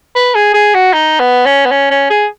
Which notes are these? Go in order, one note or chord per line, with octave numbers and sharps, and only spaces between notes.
B4
G#4
G#4
F#4
D#4
B3
C#4
B3
C#4
C#4
G#4